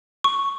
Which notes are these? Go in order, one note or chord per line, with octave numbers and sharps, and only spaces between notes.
C#6